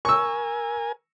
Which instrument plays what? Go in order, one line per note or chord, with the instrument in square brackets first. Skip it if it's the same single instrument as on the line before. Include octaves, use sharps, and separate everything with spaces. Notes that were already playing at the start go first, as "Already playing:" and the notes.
[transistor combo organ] A#4 G#5 [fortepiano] C#6 E6